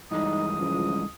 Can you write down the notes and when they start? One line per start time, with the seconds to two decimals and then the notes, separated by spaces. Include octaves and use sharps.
0.11 G2 E3 G#3 D#4 D#6
0.60 C#2 F3